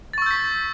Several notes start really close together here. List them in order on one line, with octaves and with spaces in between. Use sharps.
A6 C#6 E6 G6 B6